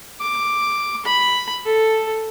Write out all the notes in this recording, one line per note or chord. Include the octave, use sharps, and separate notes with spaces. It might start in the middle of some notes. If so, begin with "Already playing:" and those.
D6
B5
A4